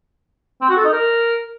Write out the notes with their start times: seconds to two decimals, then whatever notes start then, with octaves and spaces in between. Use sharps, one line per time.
0.61 C4
0.69 F#4
0.77 A4
0.85 D#4
0.92 A#4